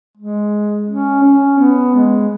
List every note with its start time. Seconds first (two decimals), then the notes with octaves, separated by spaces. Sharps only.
0.18 G#3
0.88 C#4
1.23 C#4
1.59 B3
1.95 G#3